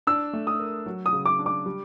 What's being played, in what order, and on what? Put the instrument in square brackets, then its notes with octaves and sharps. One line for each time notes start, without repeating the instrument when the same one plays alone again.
[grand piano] D4 [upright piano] E6
[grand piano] A3
[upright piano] D#6
[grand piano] A#4
F#3
[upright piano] D#6
[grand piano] C#3
[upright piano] D6
[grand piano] D4
[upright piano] D6
[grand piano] G3